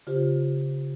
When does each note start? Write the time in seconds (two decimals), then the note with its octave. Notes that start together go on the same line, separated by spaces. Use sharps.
0.07 C#3 F4 G4 C5